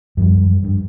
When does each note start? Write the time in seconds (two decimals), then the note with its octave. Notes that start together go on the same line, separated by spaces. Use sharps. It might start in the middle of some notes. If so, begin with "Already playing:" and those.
0.17 F#2 F3 G3
0.64 G2